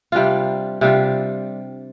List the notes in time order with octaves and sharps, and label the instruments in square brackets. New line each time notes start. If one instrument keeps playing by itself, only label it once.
[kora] C3 G3 D4 F4
C3 G3 D4 F4